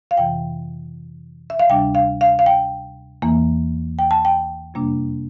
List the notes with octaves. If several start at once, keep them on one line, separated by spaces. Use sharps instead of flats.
F5
F2 C3 E3 G5
E5
F5
D2 C3 G3 D4 G5
F5
F5
F5
G5
E2 E3 A#3
G5
A5
G5
F2 C3 G3 A#3 D4